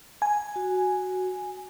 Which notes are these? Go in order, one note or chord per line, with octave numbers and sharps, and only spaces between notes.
G#5
F#4